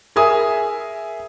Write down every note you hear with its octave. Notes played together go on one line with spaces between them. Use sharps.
G#4 A#4 E5 G#5 D#6